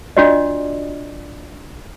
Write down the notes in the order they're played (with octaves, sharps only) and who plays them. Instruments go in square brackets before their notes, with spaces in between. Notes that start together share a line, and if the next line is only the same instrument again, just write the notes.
[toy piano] D4 F4 F#4 D5 D#5